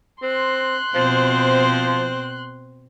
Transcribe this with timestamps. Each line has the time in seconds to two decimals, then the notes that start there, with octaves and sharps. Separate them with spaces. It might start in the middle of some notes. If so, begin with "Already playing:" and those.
0.23 C4 C6 F#6
0.95 B2 F3 C4 C5